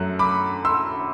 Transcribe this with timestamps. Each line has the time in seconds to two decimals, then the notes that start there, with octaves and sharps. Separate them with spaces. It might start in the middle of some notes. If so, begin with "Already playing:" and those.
Already playing: F#2 F#3 A3 F#6
0.19 B5 D6
0.65 C6 E6